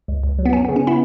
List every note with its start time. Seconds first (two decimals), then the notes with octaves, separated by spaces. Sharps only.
0.08 C#2
0.24 C#2
0.39 F#3
0.46 B3
0.53 F#2 C#4
0.65 C#3 B3
0.76 C#4
0.87 B3 E4